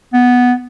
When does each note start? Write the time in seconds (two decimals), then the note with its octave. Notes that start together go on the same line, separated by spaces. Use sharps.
0.13 B3